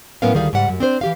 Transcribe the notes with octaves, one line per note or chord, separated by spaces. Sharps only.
A2 F#3 B3 C#4 A#4 F5
D2 D#3 G3 G#4 F5
G#2 C#3 G3 F#5
F#2
C4 D4 C5
E3 G4 F5